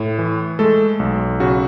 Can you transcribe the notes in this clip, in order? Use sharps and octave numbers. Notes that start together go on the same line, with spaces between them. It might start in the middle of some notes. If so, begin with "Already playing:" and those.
Already playing: A2
E3
G#3 A3 A4
B1
C#3 F#4